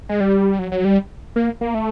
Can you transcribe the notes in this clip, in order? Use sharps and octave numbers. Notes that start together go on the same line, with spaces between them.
G#3
G3
F#3
F#3
G3
A#3
A#3
A3